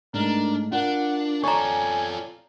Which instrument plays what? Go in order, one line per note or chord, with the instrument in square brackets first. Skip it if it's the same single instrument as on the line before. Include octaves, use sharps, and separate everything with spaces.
[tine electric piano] G#2 G#3 A3 [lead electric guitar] D4 [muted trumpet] A#4
[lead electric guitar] D4 [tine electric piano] F4 A#4 [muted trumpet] F#5
[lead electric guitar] F4 A4 [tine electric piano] C#5 D5 [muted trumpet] G#5 [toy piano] A#5 C#6